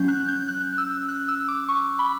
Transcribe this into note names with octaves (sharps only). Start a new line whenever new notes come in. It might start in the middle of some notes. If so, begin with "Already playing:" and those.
Already playing: F#3 C#4 G6
F#6
G6
F#6
E6
F#6
E6
D6
C#6
B5